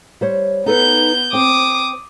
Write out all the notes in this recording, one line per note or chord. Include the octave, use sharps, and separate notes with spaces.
G3 C5 C#5
B3 D#4 A4 B4 G6
C4 C5 D6 D#6